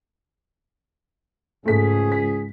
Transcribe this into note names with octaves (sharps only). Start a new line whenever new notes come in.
C#2 G#2 A3 G#4 B6
B6